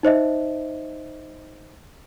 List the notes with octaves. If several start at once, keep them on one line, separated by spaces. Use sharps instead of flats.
D#4 C5 D#5 E5